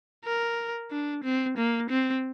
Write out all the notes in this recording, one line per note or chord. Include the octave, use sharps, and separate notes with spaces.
A#4
D4
C4
A#3
C4